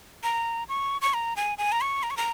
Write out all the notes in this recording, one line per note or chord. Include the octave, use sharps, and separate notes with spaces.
A#5
C#6
C#6
A#5
G#5
G#5
A#5
C#6
A#5
C#6
A#5